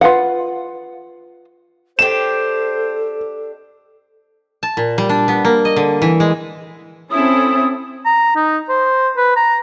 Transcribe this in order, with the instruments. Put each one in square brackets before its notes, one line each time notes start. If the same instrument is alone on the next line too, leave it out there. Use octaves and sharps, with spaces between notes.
[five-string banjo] F4 B4 F5 F#5
[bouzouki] D4 G4 [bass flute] A4 [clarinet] C5 [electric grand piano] E7
[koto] A5
A#2
G3
D4
B3
A#3
D#5
D3
E3
G#3
[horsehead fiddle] C4 C#4 [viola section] E4 A4 [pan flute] D#6
[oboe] A#5
D#4
C5
B4
A#5